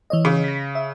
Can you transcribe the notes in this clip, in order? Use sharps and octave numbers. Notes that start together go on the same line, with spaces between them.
E3 C#5 D#5
C#3
A#6 B6
E5